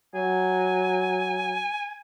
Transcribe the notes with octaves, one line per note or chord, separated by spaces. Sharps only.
F#3 G#5